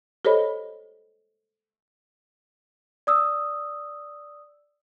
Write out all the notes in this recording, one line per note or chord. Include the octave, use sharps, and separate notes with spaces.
G4 A4 C5 C#5 D#5 B5
D5 D#6 E6